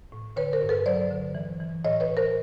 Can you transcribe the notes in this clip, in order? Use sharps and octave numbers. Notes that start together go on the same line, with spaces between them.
A2
D3 B4 C#5
A#4 C5
G2
A4 B4
F#3 C5 D5
D3
E3
E3
A2 C#5 D#5
B4 C#5
A2
A#4 C5